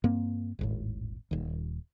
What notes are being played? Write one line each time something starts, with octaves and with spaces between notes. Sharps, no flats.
G2 A#3 C4
D#1 G#1 A2
D#1 D#2